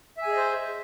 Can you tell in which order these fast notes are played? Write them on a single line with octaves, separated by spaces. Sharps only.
E5 G#5 G#4 D#5 C5